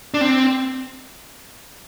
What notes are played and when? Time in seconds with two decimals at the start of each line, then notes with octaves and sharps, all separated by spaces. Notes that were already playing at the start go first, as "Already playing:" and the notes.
0.14 D4
0.21 C4